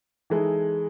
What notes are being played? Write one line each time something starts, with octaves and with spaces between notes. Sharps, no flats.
E3 G#3 D#4 A4